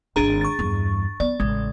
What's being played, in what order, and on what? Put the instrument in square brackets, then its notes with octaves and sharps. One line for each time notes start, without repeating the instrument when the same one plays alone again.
[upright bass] G#1 D#3 [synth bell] D4 G#4 A#5
[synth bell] C#6 A6
[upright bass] E2 G2
[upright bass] B3 [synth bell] D5
[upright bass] A1 C#3 [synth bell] G#3